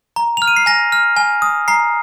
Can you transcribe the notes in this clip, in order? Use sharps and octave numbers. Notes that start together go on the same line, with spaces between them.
A#5
F6 F7
D#7
C7
G#5 A#6
F6
G#5
D#6
A#5 C7